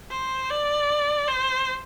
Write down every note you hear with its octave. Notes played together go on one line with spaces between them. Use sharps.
C5
D5
C5